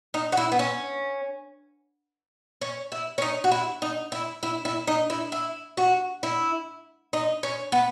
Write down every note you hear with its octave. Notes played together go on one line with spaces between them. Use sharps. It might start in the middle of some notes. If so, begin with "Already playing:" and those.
D#4
F#4
E4
B3
C#4
C#4
E4
C#4
D#4
F#4
E4
D#4
E4
E4
E4
D#4
E4
E4
F#4
E4
D#4
C#4
B3